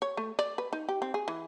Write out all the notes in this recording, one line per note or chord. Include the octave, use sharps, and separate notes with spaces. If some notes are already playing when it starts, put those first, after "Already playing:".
C#5
A3
D5
B4
D#4
G4
C4
G#4
E3